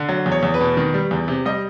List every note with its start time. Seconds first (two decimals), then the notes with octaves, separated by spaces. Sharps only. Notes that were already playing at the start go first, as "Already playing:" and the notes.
Already playing: D3
0.09 F#3
0.26 E2
0.32 C#5
0.43 E2
0.54 B4
0.60 B2
0.77 D#3
0.94 G3
1.11 E2
1.28 C3
1.45 G3 D#5